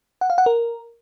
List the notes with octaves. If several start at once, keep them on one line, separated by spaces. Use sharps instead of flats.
F#5
F5
F#5
A#4